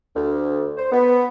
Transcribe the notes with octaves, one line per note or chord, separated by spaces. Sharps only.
D2
C5
B3